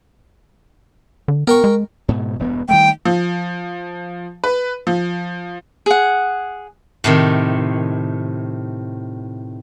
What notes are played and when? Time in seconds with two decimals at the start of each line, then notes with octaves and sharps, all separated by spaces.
1.28 D3
1.47 B3 A#4 G5 C#6
1.64 G#3
2.08 G#2 B2
2.39 E1 G2 B3
2.69 D#3 G3 A3 G5
3.05 F3
4.44 B4
4.87 F3
5.86 G#4 F#5
7.04 A2 C3 D#3